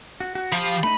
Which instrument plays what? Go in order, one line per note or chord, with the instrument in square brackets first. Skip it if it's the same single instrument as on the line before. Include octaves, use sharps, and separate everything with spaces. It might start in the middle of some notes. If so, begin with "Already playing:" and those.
[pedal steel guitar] F#4
F#4
[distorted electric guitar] F3 [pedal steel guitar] G4 F5 B5
[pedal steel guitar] A3 D#4 D#5 [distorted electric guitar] B5